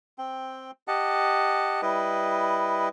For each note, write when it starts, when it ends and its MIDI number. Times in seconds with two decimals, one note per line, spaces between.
0.18 0.71 60
0.18 0.71 79
0.88 1.81 67
0.88 1.81 75
0.88 1.81 78
0.88 1.81 81
1.82 2.89 55
1.82 2.89 64
1.82 2.89 71
1.82 2.89 75